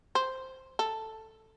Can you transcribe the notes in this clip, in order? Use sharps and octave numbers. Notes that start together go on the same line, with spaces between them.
C5
A4